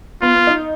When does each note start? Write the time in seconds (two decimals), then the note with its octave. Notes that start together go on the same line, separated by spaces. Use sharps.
0.22 B3 F4
0.35 B3
0.47 D#4